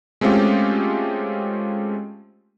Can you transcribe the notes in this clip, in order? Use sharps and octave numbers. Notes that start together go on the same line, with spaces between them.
G#3 A3 C4 C#4 F4 G4